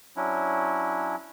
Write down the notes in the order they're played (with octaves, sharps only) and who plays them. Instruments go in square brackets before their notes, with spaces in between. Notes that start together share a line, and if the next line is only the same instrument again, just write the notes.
[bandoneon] F#3 C#4 D4 E4